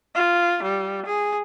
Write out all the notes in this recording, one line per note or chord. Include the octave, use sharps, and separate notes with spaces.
F4
G3
G#4